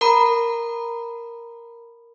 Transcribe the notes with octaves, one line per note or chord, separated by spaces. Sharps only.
A#4 A#5 B5